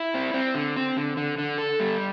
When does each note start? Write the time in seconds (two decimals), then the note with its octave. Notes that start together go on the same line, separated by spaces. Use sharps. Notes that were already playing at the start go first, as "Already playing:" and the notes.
Already playing: E4
0.14 C4
0.34 C4
0.55 D3
0.76 C4
0.97 D3
1.17 D3
1.38 D3
1.58 A4
1.80 G3